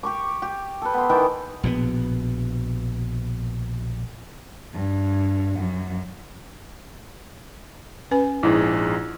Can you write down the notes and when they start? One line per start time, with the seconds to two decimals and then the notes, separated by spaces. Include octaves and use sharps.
0.03 G4 C#6 D6
0.42 G4
0.82 A4 B4
0.94 B3 C6
1.09 D#3 E3 B3 G5
1.63 A#1 B2 F3 B3
4.72 G2
5.58 F#2
8.11 C#4 B4 G#5
8.43 A#1 G#2 E4 G#4